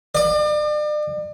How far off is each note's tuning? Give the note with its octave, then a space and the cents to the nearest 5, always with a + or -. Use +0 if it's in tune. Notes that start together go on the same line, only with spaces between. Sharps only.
D5 +40